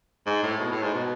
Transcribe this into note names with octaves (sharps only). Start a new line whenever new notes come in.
G#2
A2
B2
A2
G#2
B2